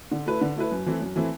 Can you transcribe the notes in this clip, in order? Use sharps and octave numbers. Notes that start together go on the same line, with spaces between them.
D3
A3 E4 B4
D3
A3 E4 B4
F#2
E3 A3 C4 E4
F#2
E3 A3 C4 E4